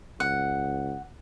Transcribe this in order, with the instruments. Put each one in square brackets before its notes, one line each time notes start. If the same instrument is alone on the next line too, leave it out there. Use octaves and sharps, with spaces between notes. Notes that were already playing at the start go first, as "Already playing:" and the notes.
[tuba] C#2 [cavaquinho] F#5